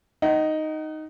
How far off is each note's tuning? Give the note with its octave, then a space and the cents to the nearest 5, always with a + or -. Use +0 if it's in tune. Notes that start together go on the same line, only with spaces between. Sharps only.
D#4 +0 F#5 +40